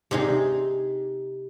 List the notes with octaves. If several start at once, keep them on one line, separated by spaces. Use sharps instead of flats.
C3 D#4 G#4